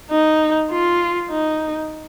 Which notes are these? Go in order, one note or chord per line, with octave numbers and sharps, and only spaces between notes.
D#4
F4
D#4